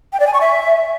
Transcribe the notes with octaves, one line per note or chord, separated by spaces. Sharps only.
G5
D5
G#5
C#6
E5